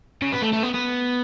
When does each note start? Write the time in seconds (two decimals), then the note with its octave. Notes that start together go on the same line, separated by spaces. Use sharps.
0.22 C#3
0.33 B3
0.42 A3
0.53 A3
0.63 B3
0.74 B3